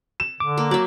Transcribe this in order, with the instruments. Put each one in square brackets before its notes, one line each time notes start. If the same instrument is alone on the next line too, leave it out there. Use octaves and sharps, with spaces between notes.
[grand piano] E7
[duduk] D3 [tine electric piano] D6
[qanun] A#3
[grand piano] F#3 [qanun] D5 E5